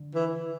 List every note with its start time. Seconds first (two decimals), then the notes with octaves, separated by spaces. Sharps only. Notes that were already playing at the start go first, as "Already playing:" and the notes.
Already playing: D3
0.15 E3